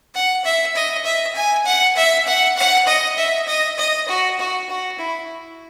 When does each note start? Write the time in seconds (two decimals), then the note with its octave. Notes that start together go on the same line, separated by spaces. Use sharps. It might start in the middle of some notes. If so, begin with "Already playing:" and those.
0.15 F#5
0.45 E5
0.75 D#5
1.05 E5
1.35 G#5
1.65 F#5
1.96 E5
2.27 F#5
2.57 F#5
2.87 D#5
3.17 E5
3.47 D#5
3.78 D#5
4.08 F#4
4.39 F#4
4.69 F#4
4.99 E4